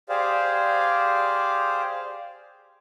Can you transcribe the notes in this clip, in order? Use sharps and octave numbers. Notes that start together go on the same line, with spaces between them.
G4 G#4 C5 D5 F5